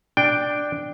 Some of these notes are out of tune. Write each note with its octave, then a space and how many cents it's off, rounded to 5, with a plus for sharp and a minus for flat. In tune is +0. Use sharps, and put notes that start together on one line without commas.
D4 +5 G5 +0